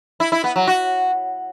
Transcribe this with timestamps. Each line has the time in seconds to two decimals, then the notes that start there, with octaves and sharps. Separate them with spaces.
0.20 E4
0.32 E4
0.44 B3
0.56 F#3
0.67 F#4